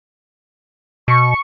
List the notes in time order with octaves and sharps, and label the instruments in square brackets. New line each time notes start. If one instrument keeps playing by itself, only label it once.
[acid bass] B2 [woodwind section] C#6